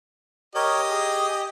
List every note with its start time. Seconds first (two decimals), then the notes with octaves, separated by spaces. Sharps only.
0.55 G4 A#4 C#5 D#5
0.90 G#4